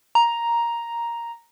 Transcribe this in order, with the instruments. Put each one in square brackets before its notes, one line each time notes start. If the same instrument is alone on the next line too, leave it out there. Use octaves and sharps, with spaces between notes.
[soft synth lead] A#5